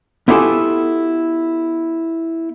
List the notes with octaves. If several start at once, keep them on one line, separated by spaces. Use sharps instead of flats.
B3 E4 F4 G4 A4 G#5